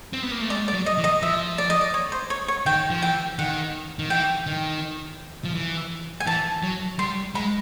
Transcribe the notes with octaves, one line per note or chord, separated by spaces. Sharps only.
C4
B3
A#3
A3
G#3 D5
D5
F#3
D#5
E3
D#5
F3 E5
D5
D#5
D5
C#5
C5
C#5
C#5
D#3 G5
F3
E3 G5
D#3 F#5
D#3
E3 G5
D#3
F3
E3
G#5
E3 A5
F#3
G3 C6
G#3 B5